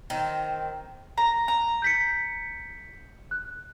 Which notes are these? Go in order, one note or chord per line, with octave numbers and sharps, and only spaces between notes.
D#3 C4
A#5
A#5
G6 B6 C#7
F#6